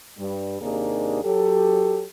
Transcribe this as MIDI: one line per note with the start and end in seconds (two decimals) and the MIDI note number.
0.18 0.57 43
0.18 0.57 55
0.61 1.20 39
0.61 1.20 48
0.61 1.20 58
0.61 1.20 62
0.61 1.20 63
0.61 1.20 68
1.23 2.04 54
1.23 2.04 67
1.23 2.04 69